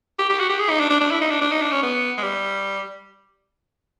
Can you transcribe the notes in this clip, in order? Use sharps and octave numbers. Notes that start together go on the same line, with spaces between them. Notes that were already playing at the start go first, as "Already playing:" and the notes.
G4
G4
F#4
G4
G#4
D#4
D4
D4
D4
E4
D#4
D4
D4
D#4
D4
C#4
B3
G#3
G3